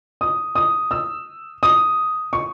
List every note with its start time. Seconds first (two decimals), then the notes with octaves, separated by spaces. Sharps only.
0.21 D#6
0.55 D#6
0.91 E6
1.63 D#6
2.33 C#6